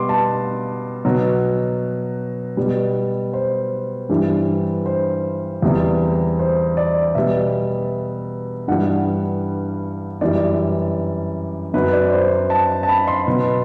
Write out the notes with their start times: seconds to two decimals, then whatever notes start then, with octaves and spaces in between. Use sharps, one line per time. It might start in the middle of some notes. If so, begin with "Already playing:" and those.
Already playing: B2 G3 C6 D6
0.09 A5
1.05 B2 F#3
2.57 B2 G3
3.33 C5
4.09 G2 E3 G3
4.86 C5
5.62 E2 C3 G3
6.39 C5
6.77 D5
7.15 B2 G3 E5
8.68 G2 E3 G3 F#5
10.21 F#2 E3 G3 D5
11.74 F#2 F#3 B4
11.92 D5
12.12 C5
12.50 A5
12.83 A5
12.89 B5
13.07 C6
13.27 B2 F#3